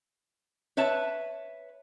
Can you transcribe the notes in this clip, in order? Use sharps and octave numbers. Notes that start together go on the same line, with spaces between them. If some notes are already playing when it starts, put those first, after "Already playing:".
B4 C#5 E5 A5